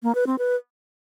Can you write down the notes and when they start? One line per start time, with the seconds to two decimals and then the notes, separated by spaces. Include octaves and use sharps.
0.03 A#3
0.15 B4
0.27 C4
0.39 B4